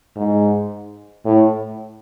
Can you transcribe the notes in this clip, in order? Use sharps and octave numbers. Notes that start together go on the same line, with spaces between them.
G#2
A2